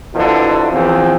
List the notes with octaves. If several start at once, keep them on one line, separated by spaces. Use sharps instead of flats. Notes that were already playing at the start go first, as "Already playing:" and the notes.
F2 B2 D3 F3 F#3 E4
E2 F3 C4